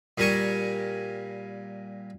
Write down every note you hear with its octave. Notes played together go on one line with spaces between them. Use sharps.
A#2 G3 A#4 G#5 C#6